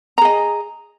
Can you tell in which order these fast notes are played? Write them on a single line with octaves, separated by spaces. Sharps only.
A#5 G#4 D#5